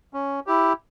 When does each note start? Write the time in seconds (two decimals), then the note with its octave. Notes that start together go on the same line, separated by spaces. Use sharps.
0.14 C#4
0.47 E4 G4